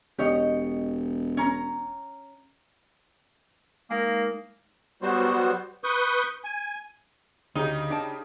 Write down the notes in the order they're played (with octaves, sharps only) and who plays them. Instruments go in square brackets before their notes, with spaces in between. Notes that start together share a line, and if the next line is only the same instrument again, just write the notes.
[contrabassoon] E1 [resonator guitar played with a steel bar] G4 C#5 D#5
[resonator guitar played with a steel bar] C#4 A#5
[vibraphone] G#3 D#4 A#4 [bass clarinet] A#3
[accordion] F#3 G3 B3 F#4 C5
B4 C#6 D#6 G6
G#5
[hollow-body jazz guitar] D2 [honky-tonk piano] C#3 G4 [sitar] D#4
[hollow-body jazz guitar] D4 G5 A5